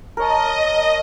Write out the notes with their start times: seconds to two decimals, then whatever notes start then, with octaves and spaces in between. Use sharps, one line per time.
0.17 A#4 C#5 D#5 A5